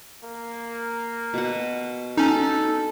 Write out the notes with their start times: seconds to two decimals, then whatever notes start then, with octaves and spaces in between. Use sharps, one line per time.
0.24 A#3
1.34 B2 F#5
2.17 C#4 D#4 A4